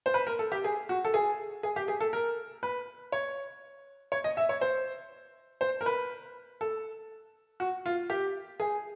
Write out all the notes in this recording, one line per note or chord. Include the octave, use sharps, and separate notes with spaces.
C5
B4
A#4
A4
G4
G#4
F#4
A4
G#4
G#4
G4
G#4
A4
A#4
B4
C#5
C#5
D#5
E5
C#5
C5
C5
A#4
B4
A4
F#4
F4
G4
G#4